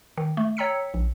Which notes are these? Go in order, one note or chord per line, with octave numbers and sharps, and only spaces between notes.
D#3
A3
C#5 G5 A#5 E6 B6 C#7
A#1